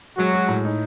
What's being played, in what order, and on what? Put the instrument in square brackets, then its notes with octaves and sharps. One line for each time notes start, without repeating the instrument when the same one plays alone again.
[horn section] F#3 F#4 [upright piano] G#3
[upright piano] G#3
A2
D#4